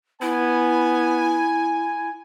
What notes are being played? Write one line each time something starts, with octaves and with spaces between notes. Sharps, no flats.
B3 E4 G#5